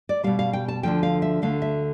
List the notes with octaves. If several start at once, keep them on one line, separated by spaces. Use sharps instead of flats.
D5
B2 G3 F5
F5
G5
A5
D2 D3 F3 A3 G5
F5
E5
D2 D3 A3 F5
E5